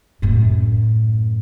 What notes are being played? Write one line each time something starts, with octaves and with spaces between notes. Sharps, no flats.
F#2 A2